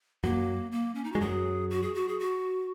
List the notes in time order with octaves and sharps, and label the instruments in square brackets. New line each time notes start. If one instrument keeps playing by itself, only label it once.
[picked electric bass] F#2 F#3 [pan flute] A#3
[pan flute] A#3
C#4
D#4
[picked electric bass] G#3 [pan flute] F#4
[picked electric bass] F#2 F#3 [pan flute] G#4
[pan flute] F#4
G#4
F#4
G#4
F#4